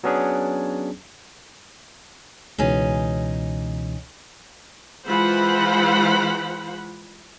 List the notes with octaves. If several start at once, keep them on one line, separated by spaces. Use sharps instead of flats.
F#3 B3 C#4 D4 G#4
C#2 B2 E3 C#4 D#4 G#4
E3 G#3 F4 C5 F#5 B5